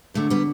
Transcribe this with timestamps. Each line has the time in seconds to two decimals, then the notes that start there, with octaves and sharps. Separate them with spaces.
0.14 E2 D3 F#3 A3
0.30 G3 B3